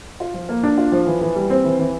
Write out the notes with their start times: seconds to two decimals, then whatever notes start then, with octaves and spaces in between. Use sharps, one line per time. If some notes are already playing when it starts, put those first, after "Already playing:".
0.20 F4
0.34 F3
0.49 A#3
0.63 D4
0.78 F4
0.92 F3
1.07 E3
1.21 E3
1.36 G3
1.50 C4
1.64 E3
1.79 E3